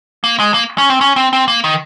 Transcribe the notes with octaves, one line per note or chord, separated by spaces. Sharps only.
A#3
G#3
A#3
C#4
C4
C#4
C4
C4
A#3
D#3